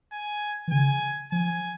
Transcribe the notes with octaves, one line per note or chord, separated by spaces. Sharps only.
G#5
E3
C#3 G#5
F3 G#5